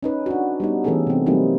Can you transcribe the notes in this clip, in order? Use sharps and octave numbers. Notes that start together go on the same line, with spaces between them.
C#4 D#4 B4
D4 F#4
G3 B3 D#4
E3 A3 B3 C#4 G#4 A4
C3 C4
F#3 G3 A#3 C4 D#4 E4